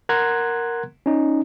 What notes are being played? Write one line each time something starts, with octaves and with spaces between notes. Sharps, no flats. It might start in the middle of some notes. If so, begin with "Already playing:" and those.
A#4 F#5 A#5 C6 F#6 G#6
C#4 D#4